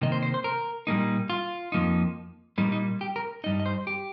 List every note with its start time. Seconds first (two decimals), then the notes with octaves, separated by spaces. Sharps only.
0.02 C3 D#3 A#3 D#5
0.12 C5
0.23 C5
0.34 C5
0.44 A#4
0.87 A#2 G3 A#3 D#4
1.30 F4
1.72 F2 F3 A#3 D#4
2.58 A#2 G3 A#3 D#4
2.72 D#4
3.01 G4
3.16 A#4
3.44 G2 G3 D#4 D#5
3.60 D#5
3.66 C5
3.87 G4